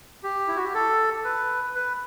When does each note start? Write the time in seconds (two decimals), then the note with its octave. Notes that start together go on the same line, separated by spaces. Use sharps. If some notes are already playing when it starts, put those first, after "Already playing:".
0.23 G4
0.48 E4
0.56 F#4
0.65 G4
0.74 A4
1.25 B4
1.75 B4